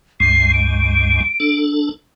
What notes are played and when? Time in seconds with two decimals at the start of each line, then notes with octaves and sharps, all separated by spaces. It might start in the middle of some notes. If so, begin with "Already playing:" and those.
0.20 C#2 G2 G#3 C7
0.54 D7
1.40 D4 A4